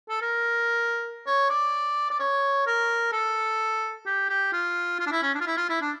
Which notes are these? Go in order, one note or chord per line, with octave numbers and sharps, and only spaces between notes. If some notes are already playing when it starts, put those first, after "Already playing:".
A4
A#4
C#5
D5
D5
C#5
A#4
A4
G4
G4
F4
F4
D4
E4
C#4
D4
F4
E4
F4
E4
D4